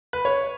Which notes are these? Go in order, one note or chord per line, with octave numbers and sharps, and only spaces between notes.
B4
C#5